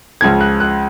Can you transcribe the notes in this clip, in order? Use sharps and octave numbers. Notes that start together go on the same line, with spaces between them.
C#2 C#3 F3 G#6
F#6
F#6